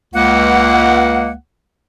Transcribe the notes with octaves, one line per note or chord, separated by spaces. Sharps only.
C#2 A#3 F#5